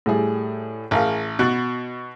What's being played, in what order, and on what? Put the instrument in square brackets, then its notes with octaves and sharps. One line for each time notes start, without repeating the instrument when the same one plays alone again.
[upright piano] A2 G3 G#4
[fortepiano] A1 [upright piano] G#4 A#4 F5
[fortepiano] B2 F#4 [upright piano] F#6 A6